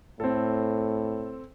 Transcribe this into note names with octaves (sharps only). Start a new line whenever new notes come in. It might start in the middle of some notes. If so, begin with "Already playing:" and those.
A2 C4 A4